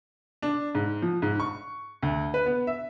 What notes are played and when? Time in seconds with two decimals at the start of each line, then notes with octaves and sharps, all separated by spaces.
0.42 D4
0.75 G#2
1.02 F3
1.22 G#2
1.40 C#6
2.02 D2
2.34 B4
2.46 B3
2.67 E5